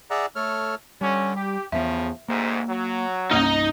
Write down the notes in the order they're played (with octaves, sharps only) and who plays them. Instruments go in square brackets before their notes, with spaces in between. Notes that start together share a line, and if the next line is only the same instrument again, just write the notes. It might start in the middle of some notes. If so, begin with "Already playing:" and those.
[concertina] G#4 D5 E5 F#5 A#5
A3 A4 C#5 F6
[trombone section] D3 C#4 [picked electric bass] G3
[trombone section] G4
[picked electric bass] E2 A#3 B3 [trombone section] A2 C#3 F3 [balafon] E5
[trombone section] D2 G#2 [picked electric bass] A#3
[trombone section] F#3
[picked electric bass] C2 G2 [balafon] A#3 C#4 [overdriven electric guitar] D#4 D#5